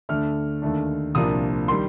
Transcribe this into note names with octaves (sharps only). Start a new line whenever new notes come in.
D2 D3 A3 D4 F6
D#2 D3 A3 D4
C2 A#2 F3 A#3 D4 D#6
D#3 G3 C6